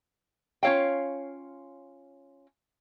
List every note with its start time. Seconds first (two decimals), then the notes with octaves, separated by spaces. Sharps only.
0.63 C#4 F4 C#5 F5 G5